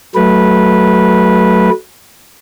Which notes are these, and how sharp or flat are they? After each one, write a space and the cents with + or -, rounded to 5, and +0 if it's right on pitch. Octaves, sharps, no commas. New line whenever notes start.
F#3 +5 A3 -10 B4 -15